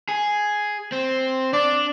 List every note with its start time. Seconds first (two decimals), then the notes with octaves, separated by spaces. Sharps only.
0.09 G#4
0.92 C4
1.53 D4 D5